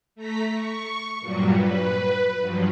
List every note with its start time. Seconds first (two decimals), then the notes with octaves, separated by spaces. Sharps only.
0.15 A3 A#5 B6
0.50 C#6
1.19 G2 A#2 F#3 G3
1.52 B4
2.39 G2 F3 F#3